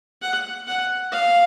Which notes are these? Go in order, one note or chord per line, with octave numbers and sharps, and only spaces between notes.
F#5
F#5
F5